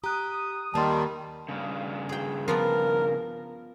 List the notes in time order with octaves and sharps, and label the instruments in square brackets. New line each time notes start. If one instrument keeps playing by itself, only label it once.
[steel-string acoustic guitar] G4 [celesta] A#5 F#6 [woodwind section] D#6
[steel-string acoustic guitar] D#2 A#3 D5 [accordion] D#3 G3 [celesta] A5 C6
[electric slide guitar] G2 C#3
[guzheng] G#4 G5
[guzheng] F3 B3 D5 [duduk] A#4